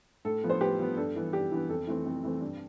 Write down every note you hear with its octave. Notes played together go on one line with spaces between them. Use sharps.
A2 A4
F3 B3
C5
A2 G4 B4
F3 B3
G2 A4
E3 B3
G2 G4
E3 B3
F2 A4
E3 A3 C4
F2
E3 A3 C4
G2